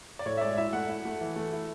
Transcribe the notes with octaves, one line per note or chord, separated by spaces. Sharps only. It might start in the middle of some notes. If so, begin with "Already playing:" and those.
D5
A2 C#5
E5
G#3 D5
E4 E5
A3 F#5
E4
A3
E3
A3
E4